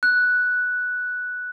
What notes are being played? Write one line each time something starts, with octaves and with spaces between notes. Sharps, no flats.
F#6